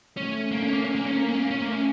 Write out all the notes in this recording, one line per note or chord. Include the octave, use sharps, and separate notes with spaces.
A3 C#4
A#3
C#4
A#3
C#4
A#3
C#4
A#3
C#4
A#3
A3 C#4
A#3
C#4